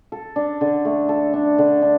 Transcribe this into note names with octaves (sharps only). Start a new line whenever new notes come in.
A4
D4
D3
A3
A4
D4
D3
D4